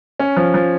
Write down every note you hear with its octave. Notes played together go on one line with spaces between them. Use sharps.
C#4
F3
F3